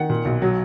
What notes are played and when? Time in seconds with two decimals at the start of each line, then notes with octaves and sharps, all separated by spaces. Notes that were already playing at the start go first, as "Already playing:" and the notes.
Already playing: D#3 F#5
0.10 A#2
0.25 B1
0.42 F#3